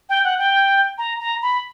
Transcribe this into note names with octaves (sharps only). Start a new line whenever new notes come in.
G5
F#5
G5
A#5
A#5
B5